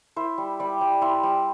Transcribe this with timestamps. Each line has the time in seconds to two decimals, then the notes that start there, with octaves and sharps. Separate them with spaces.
0.16 E4 C5
0.38 G3
0.60 G3 D5
0.81 G3
1.01 E4 C6
1.23 G3